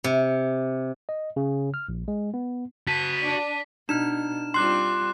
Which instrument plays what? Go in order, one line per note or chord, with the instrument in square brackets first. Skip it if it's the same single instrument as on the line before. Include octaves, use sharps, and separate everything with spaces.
[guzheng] C3
[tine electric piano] D#5
C#3
F6
A#1
G#3
B3
[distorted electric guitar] F#4 A5 [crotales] B6 [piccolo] D#7
[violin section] D4
[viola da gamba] B2 [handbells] D4 D#4 F6 [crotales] E7
[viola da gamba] G3 C4 F4 [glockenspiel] C6 [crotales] D6 F#6 C7